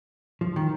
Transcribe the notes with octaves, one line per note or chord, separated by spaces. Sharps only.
F3
D#3